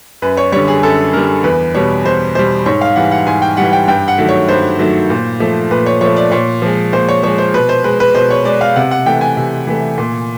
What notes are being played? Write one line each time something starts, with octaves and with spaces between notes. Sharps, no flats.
F#2 B4
C#5
D3 G3 C#5
G#4
F#2 A4
D3 G3 A#4
E2 B4
B2 G3 C#5
E2 C5
B2 G3 C5
G#2 C#5
F5
E3 G3 F#5
F#5
G#2 G#5
G5
E3 G3 F#5
G5
G2 G5
F#5
D#3 F#3 A3
C#5
G2 C5
D#3 F#3 A3
A#2
F3 A3
A#2 B4
C#5
F3 A3 C#5
D5
A#2 C#5
F3 G#3
A#2 C5
C#5
F3 G#3 C#5
C5
B2 B4
C5
G#3 B4
B4
B2 C5
C#5
G#3 D5
F5
C3 F#5
F#5
E3 A3 G5
G#5
C3
E3 A3
A#2